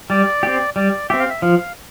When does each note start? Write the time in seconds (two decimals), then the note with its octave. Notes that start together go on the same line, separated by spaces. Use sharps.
0.10 G3 D5
0.43 C4 G4
0.76 G3 D5
1.10 C4 G4 E5
1.19 F5
1.30 E5
1.42 F3 F5